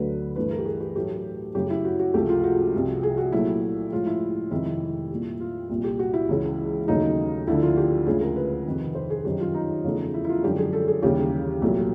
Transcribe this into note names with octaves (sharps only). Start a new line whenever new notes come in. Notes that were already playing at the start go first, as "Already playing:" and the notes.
Already playing: D2 D3 F#3 A3 B4
G2 E3 A3 B4
A#4
G4
G#4
G4
A2 F#3 A3 G4
F#2 C#3 F#3 A3 G4
E4
F#4
F#4
C#2 C3 F3 A3 G4
F4
F#4
C2 C3 F3
G#4
F#4
A#2 F#3 A3 E4
A2 F3 G#3 F4
E4
F2 C3 D#3 G#3 E4
E4
A#2 G3
F4
C2 A#2 G3
G4
F#4
E4
C#2 C#3 E3 G#3
D#2 C#3 F#3 A3 D#4
D2 D3 F3 E4
F4
G4
D2 C#3 F3 G#3 G#4
A#4
B4
F2 C3 D#3
C5
G#4
F#2 D#3 G3 G4
F4
D#4
E2 C#3 F3 A3
E4
E4
F4
F#2 D3 F3 G#3 G4
G#4
A4
G#4
D#2 C#3 E3 G3 G4
C2 A#2 F#3 A3 G4